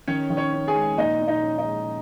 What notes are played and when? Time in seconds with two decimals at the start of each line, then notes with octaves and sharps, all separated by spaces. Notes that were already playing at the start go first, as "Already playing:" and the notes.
0.08 D#3 C#4 C#5
0.30 D#3
0.37 C#4 C#5
0.53 C#4
0.68 G#4 G#5
0.76 G#3
0.97 A#2 D#4 D#5
1.21 A#2
1.28 D#4 D#5
1.42 C#4
1.57 D#4 D#5
1.65 G#3